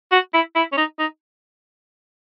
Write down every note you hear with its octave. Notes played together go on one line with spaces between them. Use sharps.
F#4
E4
E4
C#4
D#4
D#4